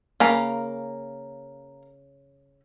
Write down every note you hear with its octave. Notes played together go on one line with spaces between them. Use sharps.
C#3 A#3 A#5